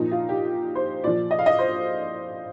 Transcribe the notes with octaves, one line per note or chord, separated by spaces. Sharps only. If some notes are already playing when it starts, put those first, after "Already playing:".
Already playing: A#2 F3 D#4
F4
G4
C5
A#2 F3 D5
D#5
F5
D#5
C5